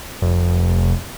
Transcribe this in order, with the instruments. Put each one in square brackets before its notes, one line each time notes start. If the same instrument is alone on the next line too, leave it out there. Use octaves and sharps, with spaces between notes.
[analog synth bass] F1